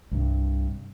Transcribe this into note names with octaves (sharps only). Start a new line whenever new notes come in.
C2 G2